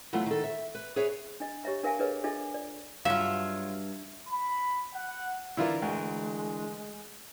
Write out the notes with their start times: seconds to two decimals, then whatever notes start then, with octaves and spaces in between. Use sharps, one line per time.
0.13 E3 F#3 A3 B3 F4
0.26 D#3 A4
0.44 E5
0.75 B4
0.96 G#4 B4 C#5 E5
1.40 D4 D#5
1.64 G4 C#5 D#5 E5 A#5
1.83 D4 A#4 E5 F5 G#5 A5
1.99 D4 G#4 A#4 B4 C#5 D#5
2.24 D4 F4 G#4 A4 D#5 E5
2.54 D5
3.05 G2 F#3 F4 E5 F5
4.28 B5
4.95 F#5
5.57 D3 E3 E4 F4 A#4 D5
5.82 D2 G#3